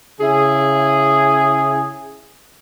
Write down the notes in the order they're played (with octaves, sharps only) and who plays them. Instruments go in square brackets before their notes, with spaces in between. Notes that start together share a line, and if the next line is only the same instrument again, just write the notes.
[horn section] C#3 E4 G#4